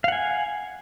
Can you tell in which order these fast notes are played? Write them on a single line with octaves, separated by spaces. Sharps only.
F5 F#5 G#5